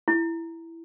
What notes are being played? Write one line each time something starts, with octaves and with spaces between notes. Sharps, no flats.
E4